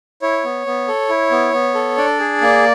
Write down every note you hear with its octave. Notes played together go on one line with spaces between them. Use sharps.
E4 C#5
B3
B3
A4
E4
B3
B3
A4
D4 D5
G#4
A#3